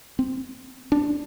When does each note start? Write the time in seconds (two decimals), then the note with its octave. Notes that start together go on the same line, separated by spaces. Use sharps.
0.19 C4
0.92 D4